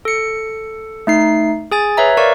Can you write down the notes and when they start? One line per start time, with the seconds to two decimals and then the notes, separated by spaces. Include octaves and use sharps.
0.05 A4 C#7
1.07 A3 D#4 C7
1.72 G#4 G#5 A6
1.97 B4 C#5 E5 A#5
2.17 A#4 D5 F5 C#6